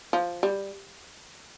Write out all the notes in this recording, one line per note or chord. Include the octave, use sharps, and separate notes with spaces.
F3
G3